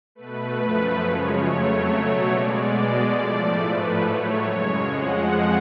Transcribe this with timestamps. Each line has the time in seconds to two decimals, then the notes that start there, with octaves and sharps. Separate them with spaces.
0.15 B2 A3 B4
0.58 F#2 F3 A3
1.01 F#2 C#3 F3 G#3 C#5
1.44 F2 C#3 F#3 A3
1.87 B2 F#3 A3
2.30 B2 G#3 D5
2.73 B2 G#3
3.16 A2 F3 A3
3.59 G#2 F3 A3 B4
4.01 A2 F#3 A3 C#5
4.44 F#2 C#3 G#3
4.88 F2 F3 G#3 F#5